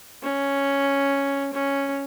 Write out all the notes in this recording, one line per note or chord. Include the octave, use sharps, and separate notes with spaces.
C#4
C#4